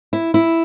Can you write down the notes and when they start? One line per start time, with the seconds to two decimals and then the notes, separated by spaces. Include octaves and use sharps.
0.13 E4
0.34 E4